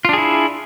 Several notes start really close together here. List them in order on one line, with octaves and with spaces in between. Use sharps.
F4 D4 G#4 E4